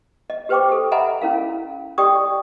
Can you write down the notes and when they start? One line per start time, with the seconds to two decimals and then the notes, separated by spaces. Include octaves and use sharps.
0.30 D#5
0.49 G4 B4 C5 G5 C#6 D6
0.69 G4 A4
0.92 D#5 E5 F#5 G#5 A#5 B5
1.22 C#4 E4 A#4 F5
1.98 G4 D5 D#5 G5 C#6 D#6